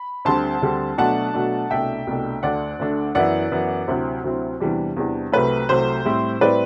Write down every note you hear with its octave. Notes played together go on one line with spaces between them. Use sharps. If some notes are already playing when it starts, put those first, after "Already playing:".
Already playing: B5
D2 D3 G3 C4 A5 C6
D2 D3 G3 C4
B2 F#3 A3 D4 F#5 A5
B2 F#3 A3 D4
C2 B2 A3 D4 E5 G5
C2 B2 A3 D4
D2 D3 A3 D4 D5 F#5
D2 D3 A3 D4
F#2 E3 B3 E4 D5 F#5
F#2 E3 B3 E4
D2 C3 F#3 C4 E4
D2 C3 F#3 C4 E4
E2 C3 E3 G3 D4
E2 C3 E3 G3 D4
C2 C3 F#3 A3 B4
C2 C3 F#3 A3 C5
A2 G3 C4 E4
A2 G3 C4 E4 B4 D5